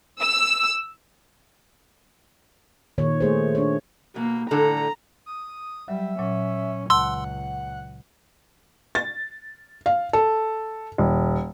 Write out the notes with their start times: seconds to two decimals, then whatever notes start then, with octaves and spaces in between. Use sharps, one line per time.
0.21 E6
2.98 A#2 D#3 C#5
3.20 A3 G#4 C5
3.55 D4 C#5
4.16 B2 A#3
4.51 A2 D3 A4 A#5
5.26 D#6
5.88 F#3 G3 E5
6.19 A#2 F#3 C#4
6.90 C#2 F#5 A5 C6 E6
8.95 A6
9.86 F5
10.13 A4
10.98 D#1